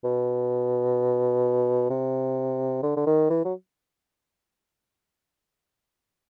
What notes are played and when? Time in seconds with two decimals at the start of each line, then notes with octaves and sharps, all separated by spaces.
0.04 B2
1.90 C3
2.83 D3
2.97 D3
3.07 D#3
3.30 E3
3.45 F#3